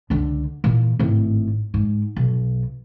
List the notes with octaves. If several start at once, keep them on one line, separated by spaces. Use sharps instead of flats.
C#2 D3
A#2 E3
G#1 A2
G#2
B1